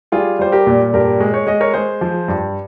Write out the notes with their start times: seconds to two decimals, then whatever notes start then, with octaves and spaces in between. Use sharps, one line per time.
0.12 G3 F4 G#4
0.39 G3 C5
0.52 G4 A#4
0.66 A#2
0.93 G2 G4 A#4
1.20 G#3
1.34 C#5
1.47 G#3 D#5
1.60 A#4 C#5
1.74 G#3 G#4 C5
2.01 F3
2.28 G2